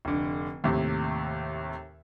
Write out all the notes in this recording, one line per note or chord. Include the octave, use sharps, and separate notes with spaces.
F1 D3
D#2 A2 C3